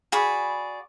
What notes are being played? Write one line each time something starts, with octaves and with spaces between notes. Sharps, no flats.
F#4 G#4 D5 B5